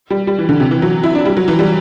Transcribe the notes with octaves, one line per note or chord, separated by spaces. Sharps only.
G3
G3
E3
D3
C3
E3
F#3
E4
D4
G3
F#3
E3
G3